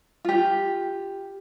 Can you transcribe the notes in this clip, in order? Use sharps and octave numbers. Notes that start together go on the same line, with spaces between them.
F4 G4